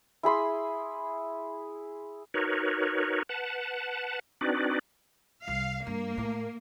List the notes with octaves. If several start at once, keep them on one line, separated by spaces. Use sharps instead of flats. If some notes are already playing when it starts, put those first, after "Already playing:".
E4 G#4 B5 C6
D#4 F#4 A#4 B4 C#5
B4 F#5 A5
C4 D4 D#4 F#4 B4 D5
C2 F5
G2 A#3
A2